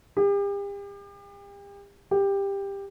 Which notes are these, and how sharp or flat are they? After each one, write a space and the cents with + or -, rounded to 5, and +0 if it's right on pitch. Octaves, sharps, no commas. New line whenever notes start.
G4 +40
G4 +15